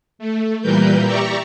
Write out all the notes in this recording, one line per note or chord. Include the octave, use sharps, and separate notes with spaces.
A3
A#2 E3 G3 A#4 B4 G6
G4 D5 E5 A#5 C#6